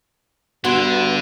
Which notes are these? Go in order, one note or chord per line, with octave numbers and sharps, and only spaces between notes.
G2 D3 B3 F#4 C6 G#6